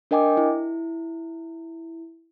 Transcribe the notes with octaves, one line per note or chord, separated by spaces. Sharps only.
D4 A#4 D#5 G5 G#5 D6
E4